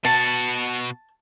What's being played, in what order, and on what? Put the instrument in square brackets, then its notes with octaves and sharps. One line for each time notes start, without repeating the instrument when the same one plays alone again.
[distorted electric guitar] B2 F#4 [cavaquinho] A5